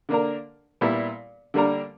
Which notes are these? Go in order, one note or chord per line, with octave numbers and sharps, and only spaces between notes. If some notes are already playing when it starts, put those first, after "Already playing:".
D3 A#3 D4 A#4
A#2 G3 B3 E4
D3 G3 A#3 D4 A#4